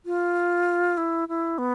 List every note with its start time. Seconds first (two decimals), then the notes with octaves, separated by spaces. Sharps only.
0.06 F4
0.97 E4
1.29 E4
1.58 B3